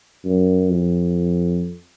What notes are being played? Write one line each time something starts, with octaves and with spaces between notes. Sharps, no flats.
F#2
F2